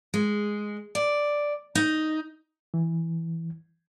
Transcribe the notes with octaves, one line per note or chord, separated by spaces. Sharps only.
G#3
D5
D#4
E3